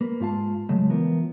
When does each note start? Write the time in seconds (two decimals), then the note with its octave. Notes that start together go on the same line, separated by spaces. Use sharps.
0.01 A#3 B4
0.20 G#2 F4 F5 A5
0.69 C#3 F3 F#3 G#3 A3
0.89 E3 F3 B3 A#4